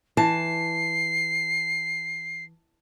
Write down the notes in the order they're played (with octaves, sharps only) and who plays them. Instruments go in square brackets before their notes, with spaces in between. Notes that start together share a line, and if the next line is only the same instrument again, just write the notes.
[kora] E3 [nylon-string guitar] A5 [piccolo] C7